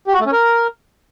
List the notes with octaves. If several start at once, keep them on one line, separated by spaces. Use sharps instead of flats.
G4
F#4
A3
C#4
A#4